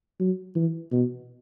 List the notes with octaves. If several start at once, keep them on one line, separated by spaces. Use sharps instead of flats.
F#3
E3
B2